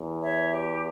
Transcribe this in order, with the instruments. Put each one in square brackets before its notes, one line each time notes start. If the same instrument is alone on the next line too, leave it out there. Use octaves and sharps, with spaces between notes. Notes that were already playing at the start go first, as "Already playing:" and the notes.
Already playing: [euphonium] E2
[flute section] C#5 E5
G4